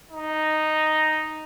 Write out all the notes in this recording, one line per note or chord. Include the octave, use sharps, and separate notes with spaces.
D#4